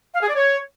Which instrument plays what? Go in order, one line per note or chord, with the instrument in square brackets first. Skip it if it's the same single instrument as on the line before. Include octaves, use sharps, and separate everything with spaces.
[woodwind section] F5
G#4
D5
C#5